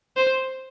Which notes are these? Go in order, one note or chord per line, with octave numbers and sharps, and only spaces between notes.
C5